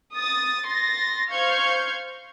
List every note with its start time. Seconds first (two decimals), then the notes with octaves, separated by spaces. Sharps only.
0.15 D#6 A6
0.65 C6 A6 A#6
1.30 C5 F5 C#6 F6 G6 G#6